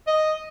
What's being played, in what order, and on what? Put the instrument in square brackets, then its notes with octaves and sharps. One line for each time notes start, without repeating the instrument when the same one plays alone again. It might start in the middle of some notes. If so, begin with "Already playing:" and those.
[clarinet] D#5